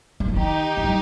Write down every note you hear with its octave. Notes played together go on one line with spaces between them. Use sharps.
G3
F3
D#3 D#4 G4
F3
G3